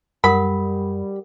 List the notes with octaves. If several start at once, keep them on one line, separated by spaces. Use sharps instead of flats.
F#2 G3 A#4 F#5 B5 D#6